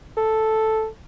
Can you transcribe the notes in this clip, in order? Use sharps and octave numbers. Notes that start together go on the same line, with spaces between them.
A4